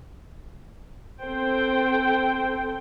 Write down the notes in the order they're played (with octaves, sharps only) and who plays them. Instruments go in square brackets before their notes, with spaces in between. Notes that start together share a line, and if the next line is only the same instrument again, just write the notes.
[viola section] C4 A4 C5 G5